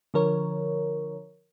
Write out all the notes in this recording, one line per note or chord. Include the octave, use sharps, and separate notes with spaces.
D3 F3 A#4 C#5